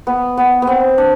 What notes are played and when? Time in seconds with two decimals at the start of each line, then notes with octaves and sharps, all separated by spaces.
0.07 B3
0.37 B3
0.62 B3
0.67 C4
0.98 D4